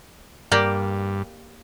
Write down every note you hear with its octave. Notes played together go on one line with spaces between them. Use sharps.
G2 A#3 G4 D5